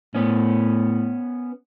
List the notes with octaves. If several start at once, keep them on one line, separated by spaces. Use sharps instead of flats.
A2 B3 C#4